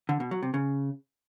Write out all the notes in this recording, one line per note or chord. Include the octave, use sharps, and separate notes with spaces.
D3
B2
F#3
C3
C#3